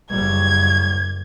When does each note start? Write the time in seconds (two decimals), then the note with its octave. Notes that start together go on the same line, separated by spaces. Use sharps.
0.10 F#1 G3 G#6